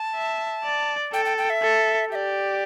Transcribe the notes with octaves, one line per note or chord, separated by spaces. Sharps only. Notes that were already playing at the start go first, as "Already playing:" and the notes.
Already playing: A5
E5
D5
A4 G5
G5
G5
E5
A4
G4 D5 E5